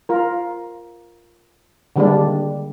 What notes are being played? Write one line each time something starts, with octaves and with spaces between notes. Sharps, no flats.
F4 A#4
D3 D#3 G3 G#3 A#3 D4